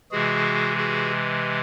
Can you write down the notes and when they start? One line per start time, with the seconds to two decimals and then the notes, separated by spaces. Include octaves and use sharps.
0.12 C3 E3 G#3 F#4 G#4
0.77 F#4 G#4